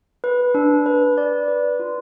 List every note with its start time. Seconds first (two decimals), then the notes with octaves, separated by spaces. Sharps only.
0.24 B4
0.55 D4
0.86 B4
1.18 D5
1.48 B4
1.80 F4